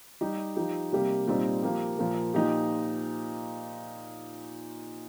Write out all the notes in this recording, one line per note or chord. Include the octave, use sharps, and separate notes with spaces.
G3 D#4 G4
F3 D#4 G4
C3 G3 A#3 G4
A#2 G3 C4 D#4
F3 A#3 G4
A#2 F3 A#3
A#2 F3 D#4 G4